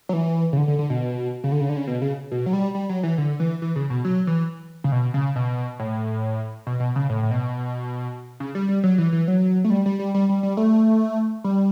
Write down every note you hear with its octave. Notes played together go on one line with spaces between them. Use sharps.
F#3
E3
C#3
D3
D3
D3
B2
C#3
D3
C#3
D3
C#3
B2
C#3
B2
F#3
G3
G3
F#3
E3
D3
E3
E3
C#3
B2
F#3
E3
C#3
B2
C#3
B2
A2
B2
B2
C#3
A2
A2
B2
C#3
G3
G3
F#3
E3
E3
F#3
A3
G3
G3
G3
G3
G3
G3
A3
G3